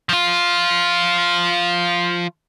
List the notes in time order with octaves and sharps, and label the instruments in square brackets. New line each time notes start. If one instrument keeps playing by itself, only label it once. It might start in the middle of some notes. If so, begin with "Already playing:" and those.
[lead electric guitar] F3 F4